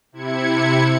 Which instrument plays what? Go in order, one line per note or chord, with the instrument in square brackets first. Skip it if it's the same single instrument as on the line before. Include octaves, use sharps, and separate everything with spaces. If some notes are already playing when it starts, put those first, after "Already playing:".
[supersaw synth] C3 E4 G#6 C#7